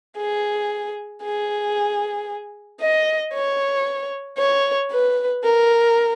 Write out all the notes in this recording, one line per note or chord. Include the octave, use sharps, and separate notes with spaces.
G#4
G#4
D#5
C#5
C#5
B4
A#4